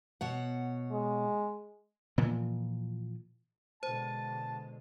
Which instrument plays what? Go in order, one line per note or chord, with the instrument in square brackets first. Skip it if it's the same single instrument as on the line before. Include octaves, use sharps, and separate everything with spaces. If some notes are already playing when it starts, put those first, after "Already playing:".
[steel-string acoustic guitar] B2 C#5 F#5
[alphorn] G#3
[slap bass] A#2 E3 F3
[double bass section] B2 D3 G#3 [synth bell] C5 [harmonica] A5